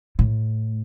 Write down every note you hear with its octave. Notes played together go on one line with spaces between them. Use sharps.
A2